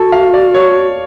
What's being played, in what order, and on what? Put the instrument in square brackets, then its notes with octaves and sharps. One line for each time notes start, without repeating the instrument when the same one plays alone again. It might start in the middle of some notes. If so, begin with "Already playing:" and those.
Already playing: [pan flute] F#4 [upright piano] A4
[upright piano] F5
D5
C#5